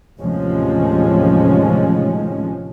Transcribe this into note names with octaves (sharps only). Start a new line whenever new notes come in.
A1 D#2 C3 F3 G#3 C#4